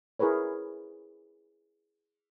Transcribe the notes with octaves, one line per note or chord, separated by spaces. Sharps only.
E4 G#4 A#4 B4 C#5